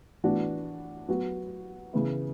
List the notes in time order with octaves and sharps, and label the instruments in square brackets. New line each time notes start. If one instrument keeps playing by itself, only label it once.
[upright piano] A2 E3 B3 D4 F#4
F#3 B3 F#4
C#3 E3 B3 E4